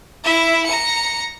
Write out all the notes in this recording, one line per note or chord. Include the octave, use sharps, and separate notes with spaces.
E4 E5
A#5 C#7